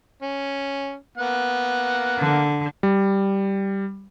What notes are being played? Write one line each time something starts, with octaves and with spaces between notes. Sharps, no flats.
C#4
A#3 B3 F#5
D3
G3